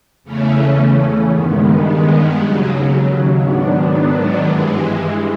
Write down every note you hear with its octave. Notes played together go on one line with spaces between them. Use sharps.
E2 C#3 E3 A3 C#4
G2 D#3 G#3 B3
D#2 C#3 F#3
G#2 D#3 F#3 B3 D4
G2 E3 G#3